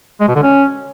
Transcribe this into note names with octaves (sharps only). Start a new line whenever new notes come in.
G#3
B2
D3
C#4